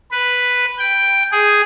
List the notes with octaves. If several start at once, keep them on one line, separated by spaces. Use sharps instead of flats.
B4
G5
G#4